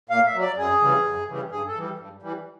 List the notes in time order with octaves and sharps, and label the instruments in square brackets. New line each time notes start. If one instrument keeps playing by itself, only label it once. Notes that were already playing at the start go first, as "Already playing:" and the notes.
[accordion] A#2 F5
E5
F#3
D5
F#2 G#4
C#3 E3 G3
F#2
C#3 E3 G3
G2 G#4
A4
E3 G3
G2
E3 G3